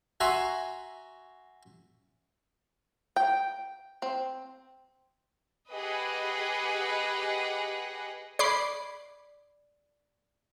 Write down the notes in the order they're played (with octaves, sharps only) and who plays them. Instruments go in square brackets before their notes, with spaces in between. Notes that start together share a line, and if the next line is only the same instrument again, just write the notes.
[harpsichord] F#4 E5 G#5 A#5 C6
[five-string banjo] G5
C4
[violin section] G4 G#4 B4 D#5 F#5
[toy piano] D5 [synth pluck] B5 D6 C7